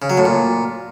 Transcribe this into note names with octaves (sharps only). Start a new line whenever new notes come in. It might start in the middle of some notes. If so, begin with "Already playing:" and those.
C#3
F#3
A2
A#2